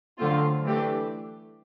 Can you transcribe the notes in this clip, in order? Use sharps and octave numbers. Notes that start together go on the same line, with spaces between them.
D3 F#3 A3 C4 F4
E3 A3 D4 G4